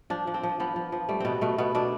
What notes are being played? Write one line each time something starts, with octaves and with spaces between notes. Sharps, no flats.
F3 D4
F3
C4
F3
C4
F3 B3
F3
F3
G3 A3
B2 B3 C4
B2 A3
B2 B3
B2 D4